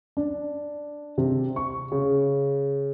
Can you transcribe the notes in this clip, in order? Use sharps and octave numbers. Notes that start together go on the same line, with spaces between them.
D4
C3
C#6
C#3